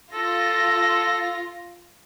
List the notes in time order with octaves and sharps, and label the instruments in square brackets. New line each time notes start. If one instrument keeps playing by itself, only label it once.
[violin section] F4 [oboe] A4 [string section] A#6